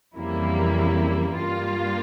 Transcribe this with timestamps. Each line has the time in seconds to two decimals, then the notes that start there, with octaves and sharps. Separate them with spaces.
0.17 F2 C#3 E3 G3 A#3 E4
1.36 G2 G3 A#3 F4